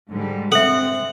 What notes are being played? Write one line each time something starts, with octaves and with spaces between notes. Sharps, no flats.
G#2 D3 G3
C4 A4 E5 F#5